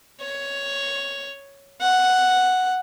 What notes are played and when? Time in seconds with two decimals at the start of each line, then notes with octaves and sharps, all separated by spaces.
0.21 C#5
1.81 F#5